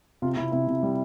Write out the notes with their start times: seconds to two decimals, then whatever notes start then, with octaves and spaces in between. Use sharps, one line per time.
0.22 C3 F4
0.37 C3 E4
0.52 C3 E4
0.68 C3
0.83 G3